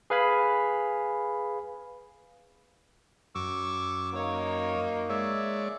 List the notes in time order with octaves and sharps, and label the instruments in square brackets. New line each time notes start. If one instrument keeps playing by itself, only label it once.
[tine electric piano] G#4 B4 F5 G#5 B5
[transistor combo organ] F#2 [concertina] C#6 D6 E6
[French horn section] A#3 D#4 [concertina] C#5
[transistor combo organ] G#3 C#5 D5 [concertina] E5